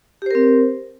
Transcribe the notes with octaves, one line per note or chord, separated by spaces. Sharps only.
C4 G4 A#4 C5